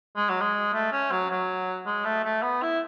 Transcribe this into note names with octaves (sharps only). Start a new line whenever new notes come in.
G#3
F#3
G#3
A3
C#4
F#3
F#3
G#3
A3
A3
B3
E4